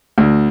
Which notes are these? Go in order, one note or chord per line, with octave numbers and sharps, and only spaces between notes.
D2